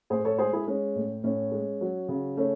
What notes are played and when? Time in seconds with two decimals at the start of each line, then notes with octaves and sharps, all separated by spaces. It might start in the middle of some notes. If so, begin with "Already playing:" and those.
0.10 A2 G#4 C5
0.25 A4 C#5
0.38 G#3 G#4 C5
0.53 E4 G#4
0.67 G#3 C#4
0.95 A2
1.24 A2 C#4
1.52 G#3
1.81 F#3
2.09 C#3
2.37 A3 C#4